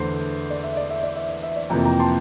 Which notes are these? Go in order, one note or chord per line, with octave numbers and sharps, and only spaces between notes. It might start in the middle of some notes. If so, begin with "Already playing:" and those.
Already playing: E2 D3 A3 C5
D5
E5
D5
E5
D5
E5
D5
E5
D5
F2 C3 E3 A#3 G5 A#5
G5 A#5
A5 C6